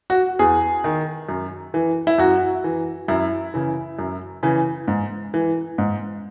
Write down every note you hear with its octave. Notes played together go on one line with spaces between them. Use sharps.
F#4
E2 G#4
D#3
F#2
E3
E4
F#2 F#4
E3
F#2 E4
C#3 E3
F#2
C#3 E3
G#2
E3
G#2